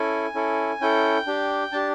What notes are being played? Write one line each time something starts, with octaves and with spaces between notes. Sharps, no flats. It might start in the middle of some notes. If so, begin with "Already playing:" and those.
Already playing: C#4 E4 A4 G#5
C#4 E4 A4
C#4 E4 A4 G5
D4 G4
D4 G4 A5